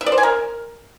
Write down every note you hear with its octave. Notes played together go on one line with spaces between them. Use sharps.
E5
D5
C5
G#5
A#4